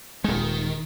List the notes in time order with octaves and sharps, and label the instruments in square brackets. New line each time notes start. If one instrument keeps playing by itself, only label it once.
[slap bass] D#1 G#3 [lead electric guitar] D#3